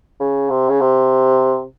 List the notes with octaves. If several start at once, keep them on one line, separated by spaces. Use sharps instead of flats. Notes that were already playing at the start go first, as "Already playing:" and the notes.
C#3
C3
C#3
C3